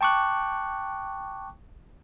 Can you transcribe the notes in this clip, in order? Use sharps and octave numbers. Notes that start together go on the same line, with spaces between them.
G5 A5 C#6 D6 F#6